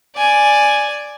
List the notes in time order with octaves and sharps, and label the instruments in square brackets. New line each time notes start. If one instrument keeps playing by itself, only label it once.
[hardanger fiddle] D5 G#5